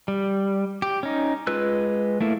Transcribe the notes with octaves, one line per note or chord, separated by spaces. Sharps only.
G3
G4
C#4 D#4
G#3 F4 B4 E6 F#6
A3 A#3 E4